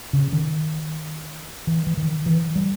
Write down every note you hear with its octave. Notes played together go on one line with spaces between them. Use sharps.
C#3
D#3
E3
E3
D#3
E3
G3